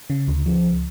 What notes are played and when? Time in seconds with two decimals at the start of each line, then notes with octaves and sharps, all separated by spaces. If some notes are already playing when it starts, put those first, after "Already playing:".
0.10 C#3
0.28 D2
0.46 F3
0.64 C#2